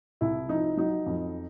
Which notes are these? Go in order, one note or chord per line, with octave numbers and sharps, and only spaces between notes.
C2 E4
F3 D#4
F#3 D#4
F2